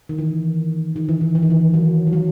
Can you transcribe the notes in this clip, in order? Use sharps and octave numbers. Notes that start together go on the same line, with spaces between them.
D#3
E3
D#3
E3
D#3
E3
D#3
E3
F#3
E3
F#3